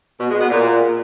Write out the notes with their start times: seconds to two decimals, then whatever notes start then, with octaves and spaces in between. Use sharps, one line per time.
0.20 B2
0.30 G#3
0.40 B3
0.50 A#2